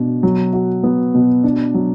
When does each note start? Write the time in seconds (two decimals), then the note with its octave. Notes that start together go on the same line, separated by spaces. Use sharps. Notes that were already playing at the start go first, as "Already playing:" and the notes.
Already playing: B2 D4
0.23 F#3
0.53 F#4
0.84 B3
1.15 B2
1.43 D4
1.74 F#3